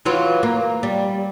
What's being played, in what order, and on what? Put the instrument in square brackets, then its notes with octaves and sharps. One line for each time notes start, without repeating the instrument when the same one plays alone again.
[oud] E3 F#3 F4
A#3
G3